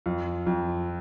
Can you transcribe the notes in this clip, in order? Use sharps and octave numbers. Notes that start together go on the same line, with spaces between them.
F2
F2